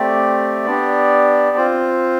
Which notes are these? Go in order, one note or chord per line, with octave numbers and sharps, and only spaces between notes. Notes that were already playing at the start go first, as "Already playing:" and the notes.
Already playing: A3 C4 G4 D5
B3 D4 G4
C4 F4 C5